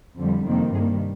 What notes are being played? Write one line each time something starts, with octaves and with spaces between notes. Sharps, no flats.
F2 D3 G3
F2 C3 D#3 G3 A#3
G2 D#3 G3 A#3 G#4